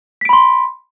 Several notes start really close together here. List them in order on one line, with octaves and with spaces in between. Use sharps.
B6 D7 B5 C6